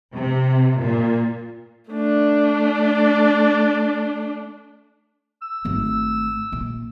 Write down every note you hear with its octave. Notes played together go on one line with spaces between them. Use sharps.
C3
A#2
A3 D4
E6
G#1 A3
A#2